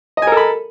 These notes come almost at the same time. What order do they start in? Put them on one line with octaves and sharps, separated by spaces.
D#5 G#5 A#4 A4 B5